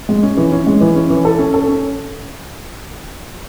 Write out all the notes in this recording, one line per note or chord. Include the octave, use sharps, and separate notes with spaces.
G#3
C#4
E3
C#4
G#3
E3
C#4
E3
A4
C#4
A4
C#4